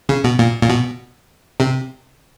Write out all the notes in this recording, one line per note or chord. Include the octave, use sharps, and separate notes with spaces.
C#3
B2
A#2
A#2
B2
C3